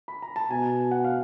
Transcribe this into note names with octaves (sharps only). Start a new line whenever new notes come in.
B5
A#5
A5
B2 G#5
F#5
F5